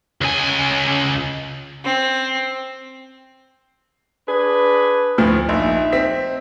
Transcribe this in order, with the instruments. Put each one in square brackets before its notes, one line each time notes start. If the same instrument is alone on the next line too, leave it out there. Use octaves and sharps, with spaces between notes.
[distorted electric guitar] C#2 G#5
[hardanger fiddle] C4
[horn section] D4 G#4 B4
[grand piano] D2 A2 F3
[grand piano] A#1 [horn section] D#4 E5
[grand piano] C4 B6